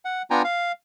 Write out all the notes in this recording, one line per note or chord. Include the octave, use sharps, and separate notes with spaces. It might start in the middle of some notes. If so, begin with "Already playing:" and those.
F#5
B3 D4 F4 G5 G#5 A#5
F5